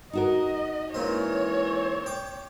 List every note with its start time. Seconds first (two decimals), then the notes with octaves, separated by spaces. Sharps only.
0.13 D#4 F#4 A#4 D#5
0.94 A#2 E3 G#3 C4 C#4 C#5
2.06 G5 D6